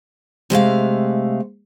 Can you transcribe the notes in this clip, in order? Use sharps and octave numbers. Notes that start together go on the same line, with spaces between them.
C3 G#3 A3 F5